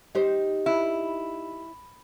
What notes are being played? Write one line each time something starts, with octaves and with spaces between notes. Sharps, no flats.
D#4 G4 C5
E4